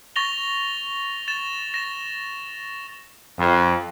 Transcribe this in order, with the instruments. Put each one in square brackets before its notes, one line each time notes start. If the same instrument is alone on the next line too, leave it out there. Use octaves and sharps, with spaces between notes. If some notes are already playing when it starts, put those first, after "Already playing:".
[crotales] C#6 A6 A#6 F7 G7
A6 E7
A#6 E7
[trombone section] F2